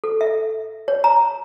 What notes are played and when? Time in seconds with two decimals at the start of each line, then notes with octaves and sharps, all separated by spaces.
0.04 A4
0.21 E5
0.88 C#5
1.04 A#5